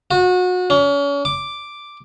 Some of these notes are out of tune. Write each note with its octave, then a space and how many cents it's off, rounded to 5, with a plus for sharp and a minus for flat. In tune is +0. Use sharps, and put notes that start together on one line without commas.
F#4 -30
C#4 +35
D6 +0